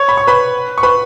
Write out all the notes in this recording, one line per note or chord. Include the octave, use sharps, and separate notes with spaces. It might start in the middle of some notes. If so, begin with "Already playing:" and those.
Already playing: C#5 C#6
B5
C#6
B4 B5
C#6
B4 B5